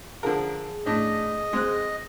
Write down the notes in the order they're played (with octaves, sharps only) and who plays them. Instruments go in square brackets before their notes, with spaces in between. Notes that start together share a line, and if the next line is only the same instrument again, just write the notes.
[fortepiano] D3 F3 A#4 [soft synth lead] G#4
[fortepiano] A2 D4 [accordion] D#5
[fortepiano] G#3 C4 F#6